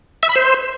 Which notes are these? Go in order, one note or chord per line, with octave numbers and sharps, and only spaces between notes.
E5
B5
C5